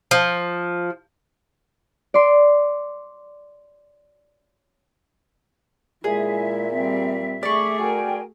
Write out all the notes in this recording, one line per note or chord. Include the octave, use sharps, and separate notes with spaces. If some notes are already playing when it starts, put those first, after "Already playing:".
F3
D5 C6
A#2 G#3 E4 G#4 E5
G3 C4
A3 G#4 D5 C#6
F#4 A#4 G5 G#5